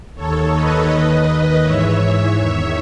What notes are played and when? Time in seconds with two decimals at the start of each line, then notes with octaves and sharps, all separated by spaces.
0.15 D#2 D#3 A4 C#5
0.52 B4 D#5
0.88 D#2 D#3
1.62 G#2 E3 C#5 E5
1.99 C#5 E5
2.36 E2 D#3